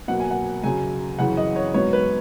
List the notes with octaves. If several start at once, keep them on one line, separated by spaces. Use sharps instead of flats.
B2 F#3 A#3 F#5
G#5
F#5
F#2 C#3 F#3 G#5
F#2 C#3 E3 F#5
D#5
C#5
G#2 F#3 B3 C#5
B4